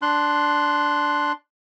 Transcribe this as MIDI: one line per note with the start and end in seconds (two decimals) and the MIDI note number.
0.02 1.32 62
0.02 1.32 84
0.02 1.32 90